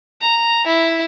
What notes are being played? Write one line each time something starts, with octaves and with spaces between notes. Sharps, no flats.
A#5
E4